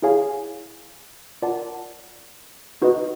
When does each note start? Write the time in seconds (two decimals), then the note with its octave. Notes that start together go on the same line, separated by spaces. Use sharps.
0.02 E4 G#4 C#5 F5 G#5
1.42 F4 A#4 D5 F#5 A5
2.82 D#4 F#4 B4 D#5